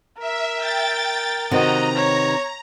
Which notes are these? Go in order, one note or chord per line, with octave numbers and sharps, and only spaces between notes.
A#4 E5
G5 A6
C3 D#3 B3 F#4 D#5 A#5
C#5